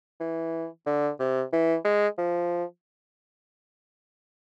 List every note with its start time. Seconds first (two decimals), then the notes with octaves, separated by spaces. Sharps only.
0.20 E3
0.86 D3
1.20 C3
1.53 E3
1.85 G#3
2.18 F3